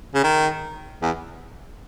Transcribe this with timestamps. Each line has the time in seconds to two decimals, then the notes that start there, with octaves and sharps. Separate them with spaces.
0.15 C#3
0.24 D#3
1.02 E2